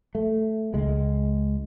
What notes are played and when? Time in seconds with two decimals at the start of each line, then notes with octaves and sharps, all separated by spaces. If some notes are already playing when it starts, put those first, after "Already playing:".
0.15 A3
0.74 C#2 G#3